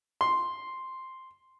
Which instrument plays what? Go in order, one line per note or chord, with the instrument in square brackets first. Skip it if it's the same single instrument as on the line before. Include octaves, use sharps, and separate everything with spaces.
[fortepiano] C6